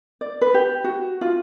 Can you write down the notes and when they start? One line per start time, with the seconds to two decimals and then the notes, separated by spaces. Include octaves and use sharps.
0.21 D5
0.41 B4
0.54 G4
0.84 F#4
1.21 F4